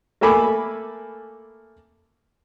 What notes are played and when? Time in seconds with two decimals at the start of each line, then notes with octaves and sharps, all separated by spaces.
0.21 A3 A#3 A4 G#5 B5 D6